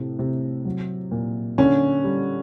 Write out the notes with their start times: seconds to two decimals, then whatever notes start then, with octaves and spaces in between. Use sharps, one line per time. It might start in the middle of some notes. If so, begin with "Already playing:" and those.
Already playing: A2 C3
0.19 C3
0.65 F#3
1.11 A#2
1.58 D3 C#4
2.04 G3